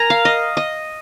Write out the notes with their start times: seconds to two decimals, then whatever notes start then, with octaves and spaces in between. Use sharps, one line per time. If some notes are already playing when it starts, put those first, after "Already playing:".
Already playing: A#4 G#5 A#5
0.10 F5
0.25 D#5
0.57 D#5